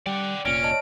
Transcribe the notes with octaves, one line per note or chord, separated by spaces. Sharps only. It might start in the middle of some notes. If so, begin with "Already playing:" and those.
G3 D5 F#5 G5
F1 A#2 C#4 D5 F6 A#6 D7
C#5 D#5 A5